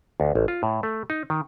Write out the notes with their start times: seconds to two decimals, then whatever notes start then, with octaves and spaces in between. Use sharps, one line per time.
0.20 D2
0.35 A1
0.48 F4
0.63 A2
0.83 A3
1.10 D#4
1.30 D#3